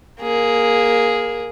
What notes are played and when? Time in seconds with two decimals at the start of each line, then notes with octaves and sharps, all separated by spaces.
0.21 A#3 G#4